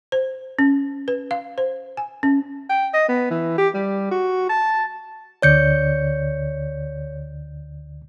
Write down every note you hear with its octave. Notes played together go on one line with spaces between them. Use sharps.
C5
C#4
B4
F5
C5
G#5
C#4
G5
D#5
B3
E3
G4
G3
F#4
A5
D2 D3 C#5 D5 G6 C#7